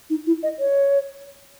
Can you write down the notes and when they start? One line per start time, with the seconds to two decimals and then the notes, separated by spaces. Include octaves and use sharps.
0.10 D#4
0.27 E4
0.43 D#5
0.59 C#5